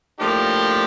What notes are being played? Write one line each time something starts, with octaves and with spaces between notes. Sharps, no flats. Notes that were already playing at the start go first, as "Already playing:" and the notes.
A2 F3 A#3 D4 G4